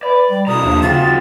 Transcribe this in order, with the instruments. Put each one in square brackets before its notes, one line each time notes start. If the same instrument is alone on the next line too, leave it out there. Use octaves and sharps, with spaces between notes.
[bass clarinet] B4 [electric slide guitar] D5
[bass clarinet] G3 [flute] G5
[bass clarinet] B2 [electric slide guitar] E4 A4 A#5 [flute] D#6
[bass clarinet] D#2 [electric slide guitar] F3 D4 E4
[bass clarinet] C#3 [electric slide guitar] C4 F4 F#4 [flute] A6